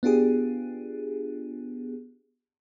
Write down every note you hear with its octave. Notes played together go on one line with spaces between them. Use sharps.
B3 D4 F4 G4 G#4